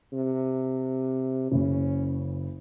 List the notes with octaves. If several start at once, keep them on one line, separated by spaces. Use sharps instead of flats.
C3
F#1 C#3 C#4